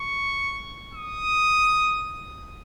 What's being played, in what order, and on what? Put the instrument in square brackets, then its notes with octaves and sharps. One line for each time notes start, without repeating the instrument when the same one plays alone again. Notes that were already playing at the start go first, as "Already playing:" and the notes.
Already playing: [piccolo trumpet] C#6
D#6